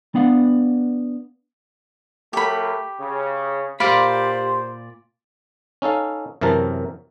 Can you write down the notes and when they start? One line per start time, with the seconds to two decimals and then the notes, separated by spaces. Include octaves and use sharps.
0.15 B3 D4 F5 F#5
2.33 F#3 A3 A#3 G4 B5
3.00 C#3
3.80 A#2 G4 C5 D5 F5 B5
5.82 C#4 D#4 A4 F5
6.41 F#2 C3 E3 A#4 A5